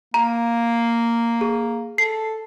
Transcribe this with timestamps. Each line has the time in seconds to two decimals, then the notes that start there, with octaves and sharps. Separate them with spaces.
0.14 A#3 A#5
1.41 G#4
1.98 A4 C7